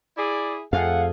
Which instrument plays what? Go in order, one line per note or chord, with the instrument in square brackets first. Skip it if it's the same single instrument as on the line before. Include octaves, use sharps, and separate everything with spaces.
[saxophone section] E4 G#4 [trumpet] D5
[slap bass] F2 [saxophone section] A3 G#4 [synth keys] F5 [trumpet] F#5